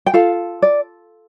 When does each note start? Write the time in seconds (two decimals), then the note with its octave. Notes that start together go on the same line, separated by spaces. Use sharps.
0.06 G5
0.13 F4 A4 F5
0.62 D5